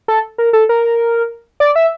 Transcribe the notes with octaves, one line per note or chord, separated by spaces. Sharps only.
A4
A#4
A4
A#4
D5
E5